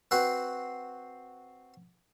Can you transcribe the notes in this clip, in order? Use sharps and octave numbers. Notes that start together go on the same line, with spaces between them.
C4 F#4 B4 C5